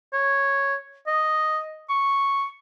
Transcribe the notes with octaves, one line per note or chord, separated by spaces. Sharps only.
C#5
D#5
C#6